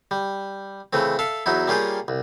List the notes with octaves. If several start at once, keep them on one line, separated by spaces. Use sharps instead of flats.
G3
C#3 E3 A3 C4
A4 E5 F5
E2 F#3 D#4 E4
G3 A#3 C#4 F4 G4 G#4
C2